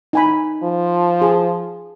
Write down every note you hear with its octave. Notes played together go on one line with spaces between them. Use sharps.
D#4 G#5 B5
F3
G#4